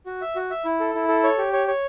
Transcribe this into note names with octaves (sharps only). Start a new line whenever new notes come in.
F#4
E5
F#4
E5
E4
A4
E4
A4
C#5
G4
C#5
C#5